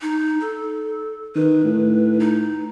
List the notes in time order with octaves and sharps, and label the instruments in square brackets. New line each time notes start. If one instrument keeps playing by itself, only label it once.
[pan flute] D#4
A4
[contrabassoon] D#3 [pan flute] B4
[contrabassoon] A2
[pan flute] D#4